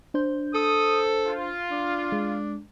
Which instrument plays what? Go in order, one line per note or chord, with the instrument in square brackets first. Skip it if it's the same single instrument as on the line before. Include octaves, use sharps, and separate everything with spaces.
[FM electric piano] D4 C5 G6
[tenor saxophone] A4 [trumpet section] D#6
[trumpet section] F4
[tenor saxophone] D4
[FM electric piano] G#3